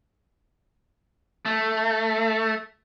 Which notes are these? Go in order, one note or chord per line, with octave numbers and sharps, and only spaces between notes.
A3